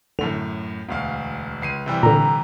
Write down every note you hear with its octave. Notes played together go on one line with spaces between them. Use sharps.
F#2 A2 D3 F7
E1 D2 F5
C#2 C7 D#7
C3 E3 G3
A#2 D3 A#5